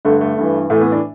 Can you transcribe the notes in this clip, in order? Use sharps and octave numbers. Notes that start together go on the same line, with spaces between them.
G2 D3 A3
A3
G2 E3
A2 E3 A3
B3
D4